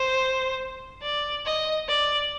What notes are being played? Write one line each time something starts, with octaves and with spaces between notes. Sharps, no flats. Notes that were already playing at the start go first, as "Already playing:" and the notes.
Already playing: C5
D5
D#5
D5